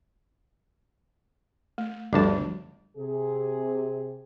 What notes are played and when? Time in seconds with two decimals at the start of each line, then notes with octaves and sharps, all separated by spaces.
1.78 A3
2.13 G1 D2 F3 G3 A5
2.97 C3 G#4